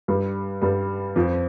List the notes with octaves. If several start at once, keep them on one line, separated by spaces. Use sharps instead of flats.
G2 G3
G2 G3
F2 F3